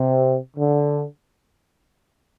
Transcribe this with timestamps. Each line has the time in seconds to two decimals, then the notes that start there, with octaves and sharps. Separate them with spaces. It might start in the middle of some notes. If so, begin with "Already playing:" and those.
Already playing: C3
0.57 D3